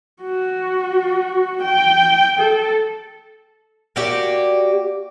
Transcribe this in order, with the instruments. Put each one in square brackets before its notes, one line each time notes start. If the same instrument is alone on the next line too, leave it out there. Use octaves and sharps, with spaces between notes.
[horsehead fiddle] F#4
G5
A4
[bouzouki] A#3 F#4 G4 D5